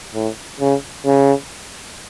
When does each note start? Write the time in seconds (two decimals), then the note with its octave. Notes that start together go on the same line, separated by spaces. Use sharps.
0.14 A2
0.60 C#3
1.05 C#3